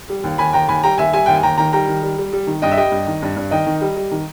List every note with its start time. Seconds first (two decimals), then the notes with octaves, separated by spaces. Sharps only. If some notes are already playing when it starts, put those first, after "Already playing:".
0.09 G3
0.24 D#2
0.38 D#2 G#5 B5
0.53 D#2 G5 A#5
0.68 D#2 G#5 B5
0.83 G3 G5 A#5
0.98 D#2 E5 G#5
1.13 G3 E5 G#5
1.26 D#2 G5
1.34 G#5
1.43 D#2 G5 A#5
1.57 D#3 G5 A#5
1.73 G3 G5 A#5
1.88 D#3
2.02 G3
2.18 G3
2.33 G3
2.47 D#3
2.62 G2 D#5 G5
2.72 E5
2.77 G3 D#5 G5
2.92 G2
3.07 D#3
3.22 G2
3.36 G2
3.51 D#3 D#5 G5
3.66 D#3
3.81 G3
3.96 G3
4.11 D#3